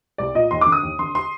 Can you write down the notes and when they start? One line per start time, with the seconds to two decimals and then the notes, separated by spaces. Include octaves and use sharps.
0.18 C2 D5
0.35 A#2 D#5
0.51 D#2 C6
0.61 D6
0.66 D3
0.72 D#6
0.83 D#2
0.99 D3 C6
1.15 C6